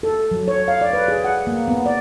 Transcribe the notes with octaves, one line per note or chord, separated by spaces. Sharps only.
A4
F#3
C#5
F5
D5
B4
G#4
F#5
A#3
B3
D5